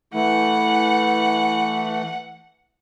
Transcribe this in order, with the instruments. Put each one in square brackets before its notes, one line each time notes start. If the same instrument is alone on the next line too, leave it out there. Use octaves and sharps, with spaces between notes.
[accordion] E3 A3 [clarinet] E4 [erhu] F#5